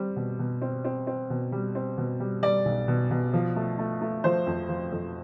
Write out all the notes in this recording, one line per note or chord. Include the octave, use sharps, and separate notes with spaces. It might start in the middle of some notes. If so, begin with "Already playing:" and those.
Already playing: G3 C4
B2
B2
C4
C4
C4
B2
G3
C4
B2
G3
G3 D5
B1
B2
B2
F3
A3
A3
A3
F3 C5
F2
F3
F2